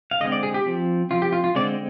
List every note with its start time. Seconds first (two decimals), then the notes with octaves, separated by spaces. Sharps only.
0.11 F5
0.20 D3 G#3 C4 D#5
0.32 D5
0.43 G#4
0.54 G4
0.66 F3 C4
1.11 F3 C4 F4
1.22 G4
1.32 F4
1.44 F4
1.55 D3 G#3 C4 D5